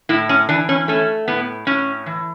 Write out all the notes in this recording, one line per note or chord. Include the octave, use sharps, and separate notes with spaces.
A2 E4
C#4
E3 D4
C#4
A3 C#4
A2 B3
A2 C#4
E3